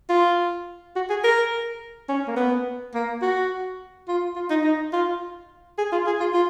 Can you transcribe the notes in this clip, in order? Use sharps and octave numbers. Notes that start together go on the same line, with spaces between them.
F4
F#4
G#4
A#4
C#4
A#3
B3
A#3
F#4
F4
F4
D#4
D#4
F4
G#4
F4
G#4
F4
F4